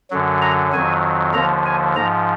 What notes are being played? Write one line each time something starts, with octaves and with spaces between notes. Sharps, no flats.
F#2 D3 F#3
A#5
F2 D#3 F#3 G#5
D#2 D3 F3 A#5
G#5
G#2 F3 A#5